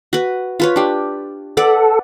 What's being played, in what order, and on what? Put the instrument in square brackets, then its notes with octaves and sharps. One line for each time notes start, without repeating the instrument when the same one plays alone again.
[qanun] F#4 B4
F4 B4 C#5
D4 G4
[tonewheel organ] A4 [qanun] B4 D5 F#5